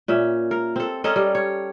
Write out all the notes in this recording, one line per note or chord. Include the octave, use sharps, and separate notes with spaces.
A#2 C#4 E5
A#4
C4 A4
C#4 A4 A#4 D#5
G3
C#5